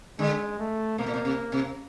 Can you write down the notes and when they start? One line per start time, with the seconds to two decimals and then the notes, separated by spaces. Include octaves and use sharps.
0.19 D3 G#3
0.59 A3
0.98 B2 A#3
1.06 A#2
1.14 B2
1.25 C3
1.52 C3